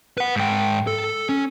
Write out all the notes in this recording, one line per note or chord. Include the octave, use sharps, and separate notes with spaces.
B4 F#5
G#2 G5
A4
C#4